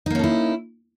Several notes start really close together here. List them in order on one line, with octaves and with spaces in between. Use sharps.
D#4 A#3 C#4 A4 E4